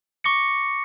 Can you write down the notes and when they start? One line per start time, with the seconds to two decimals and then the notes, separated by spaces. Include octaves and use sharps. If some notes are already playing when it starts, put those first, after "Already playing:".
0.24 C#6 D6 A#6 C#7